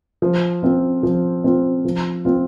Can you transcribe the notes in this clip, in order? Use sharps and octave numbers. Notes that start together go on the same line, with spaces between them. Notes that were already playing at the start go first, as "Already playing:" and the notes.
F3
C4 F4
F3
C4 F4
F3
C4 F4